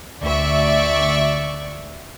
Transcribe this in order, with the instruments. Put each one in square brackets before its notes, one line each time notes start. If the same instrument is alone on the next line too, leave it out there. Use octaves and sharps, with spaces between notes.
[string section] D2 D5 E5 C#6